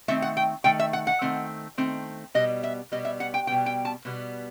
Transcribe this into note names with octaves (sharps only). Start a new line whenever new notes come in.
D#3 A3 C4 E5
F#5
G5
D#3 A3 G5
E5
F#5
F#5
D#3 A3 C4
D#3 A3 C4
B2 G3 B3 D#5
E5
B2 G3 B3 D#5
E5
F#5
G5
B2 G3 B3 G5
G5
A5
B2 G3 B3